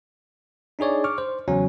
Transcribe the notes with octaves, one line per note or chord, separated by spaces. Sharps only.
D4 D#4 G#4 C#5 D5
C#6 D6 F6
C5
E2 C#3 F#3 C#4